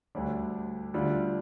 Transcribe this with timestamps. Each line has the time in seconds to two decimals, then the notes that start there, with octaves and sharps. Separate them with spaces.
0.15 D2 D3 G3 D4
0.94 D2 D3 G3 D4 F4